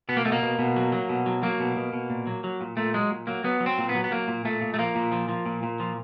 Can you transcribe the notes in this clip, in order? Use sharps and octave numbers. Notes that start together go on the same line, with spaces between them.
B2 B3
A#3
B2 A3
A#3
B2
B2
F#3
F#3
B2
F#3
F#3 A#3
B2
B2
B2
A#2
F#3
F#3
A#2
A#2 A3
F#3 G#3
A#2
F#3 A#3
F#3 B3
F#3
C4
A#2
B3
F#3
B3
F#3 A#3
A#2
A#2 A3
A#2
A3
F3 A#3
A#2
F3
F3
A#2
A#2
F3